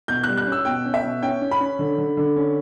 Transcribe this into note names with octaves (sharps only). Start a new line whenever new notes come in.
B2 G6
G3 F#6
F#6
C#4
E6
B2 G5
C#4
E5
B2
C#4 G5
C#4
B5
C#4
D3
D3
D3
C#4